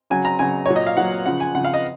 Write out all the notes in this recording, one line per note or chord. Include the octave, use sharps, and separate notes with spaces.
C#3 F#3 G#5
A#5
C#3 F#3 G#5
A#2 F#3 C#5
D#5
F5
A#2 F#3 F#5
C#3 F3 F#5
G#5
C#3 F3 F#5
F5
D#5